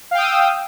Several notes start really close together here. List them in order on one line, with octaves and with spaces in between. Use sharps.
F5 G5 D#6 E6